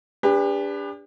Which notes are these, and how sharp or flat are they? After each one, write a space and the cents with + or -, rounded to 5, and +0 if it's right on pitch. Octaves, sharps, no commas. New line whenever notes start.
D4 -25 G4 +40 B4 +0